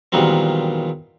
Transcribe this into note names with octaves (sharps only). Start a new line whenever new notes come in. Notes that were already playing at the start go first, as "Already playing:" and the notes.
E2 A#2 D#3 F#3 G3 C4